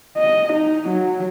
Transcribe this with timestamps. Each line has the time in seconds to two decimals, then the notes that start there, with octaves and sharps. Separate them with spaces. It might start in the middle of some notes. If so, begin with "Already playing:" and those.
0.17 D#5
0.52 D#4
0.88 F#3